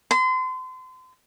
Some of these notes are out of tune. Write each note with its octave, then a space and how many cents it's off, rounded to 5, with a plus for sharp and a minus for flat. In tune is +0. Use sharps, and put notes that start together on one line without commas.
C6 -35